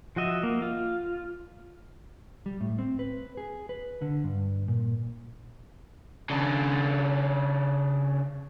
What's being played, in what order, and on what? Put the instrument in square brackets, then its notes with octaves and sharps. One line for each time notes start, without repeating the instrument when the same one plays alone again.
[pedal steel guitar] F3 F#4 D#5 E5
A#3
F4
[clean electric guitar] G3
A2
C4
B4
G#4
B4
D3
G2
A#2
[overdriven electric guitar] C#3 D4